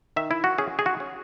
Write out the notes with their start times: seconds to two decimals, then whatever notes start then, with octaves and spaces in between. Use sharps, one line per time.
0.16 D#3 E5
0.31 E4
0.44 F#4
0.58 C#4 G#4
0.79 G#4
0.86 F#4
1.00 C#4